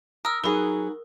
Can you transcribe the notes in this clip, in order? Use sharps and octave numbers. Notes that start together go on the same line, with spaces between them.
A#4 D#6 E6
F#3 B3 D#4 F#4 G#4 A#4